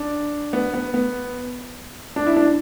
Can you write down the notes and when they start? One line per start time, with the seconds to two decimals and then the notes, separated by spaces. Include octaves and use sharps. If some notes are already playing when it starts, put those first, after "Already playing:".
Already playing: D4
0.53 B3
0.74 B3
0.94 B3
2.16 D4
2.27 E4
2.37 D4